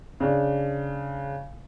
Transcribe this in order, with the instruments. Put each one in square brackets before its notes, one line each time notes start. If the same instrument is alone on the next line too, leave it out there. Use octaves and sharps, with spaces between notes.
[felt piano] C#3 D4